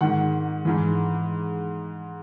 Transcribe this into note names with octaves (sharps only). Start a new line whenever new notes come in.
G#2 D#3 F#5
G#2 E3